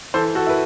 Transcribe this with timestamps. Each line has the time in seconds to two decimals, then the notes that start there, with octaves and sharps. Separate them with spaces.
0.14 E3 A4 C5
0.35 F#4 A4
0.47 E4 B4